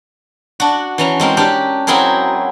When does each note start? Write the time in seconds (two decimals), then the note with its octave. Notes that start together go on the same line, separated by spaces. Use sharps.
0.60 D4 F#4
0.98 E3 C#4 A#5
1.20 G#3 C4 A#4
1.37 C#4 D4 G4 A#4
1.87 F#3 C4 E4 G#4 A#4